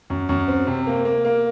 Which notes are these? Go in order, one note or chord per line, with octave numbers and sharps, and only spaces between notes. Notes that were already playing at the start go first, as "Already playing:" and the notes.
F#2
F#2
C4
C3
A#3
A#3
A#3